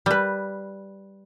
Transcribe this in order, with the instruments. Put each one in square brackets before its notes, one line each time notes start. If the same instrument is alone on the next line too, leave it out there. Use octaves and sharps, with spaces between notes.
[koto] G3 B4